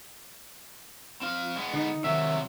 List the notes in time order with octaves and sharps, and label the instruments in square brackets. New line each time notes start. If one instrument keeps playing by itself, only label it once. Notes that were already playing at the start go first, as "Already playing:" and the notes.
[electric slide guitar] C4 F5
G#3 A#3 B3
[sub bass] D3 [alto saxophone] D#4
[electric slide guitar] C3 F#3 [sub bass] D#3 [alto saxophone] E5